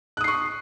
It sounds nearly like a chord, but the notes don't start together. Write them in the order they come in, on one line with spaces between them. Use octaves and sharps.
F#6 D#6 C7 C#6